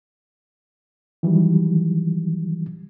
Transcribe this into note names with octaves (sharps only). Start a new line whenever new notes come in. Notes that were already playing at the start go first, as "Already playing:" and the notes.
D#3 E3 F#3 G3